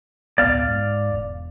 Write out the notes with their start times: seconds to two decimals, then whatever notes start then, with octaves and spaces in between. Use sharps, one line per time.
0.38 D1 B1 B3 D5 F5
0.68 G#2
1.12 E1